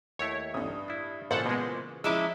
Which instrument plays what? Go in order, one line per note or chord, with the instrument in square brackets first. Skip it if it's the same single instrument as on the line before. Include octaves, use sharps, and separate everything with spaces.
[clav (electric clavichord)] D#2 A3 E4 [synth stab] C#5
[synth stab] A1 [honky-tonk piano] G2 D#6
[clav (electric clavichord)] D4 E4
[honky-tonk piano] A#2 C5 C#7 [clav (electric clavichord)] C#3 E3 [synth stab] A4 F#5
[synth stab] B2 G#3
[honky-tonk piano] F3 A#5 [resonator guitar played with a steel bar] G#3 C#4 E4 [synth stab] D6 E6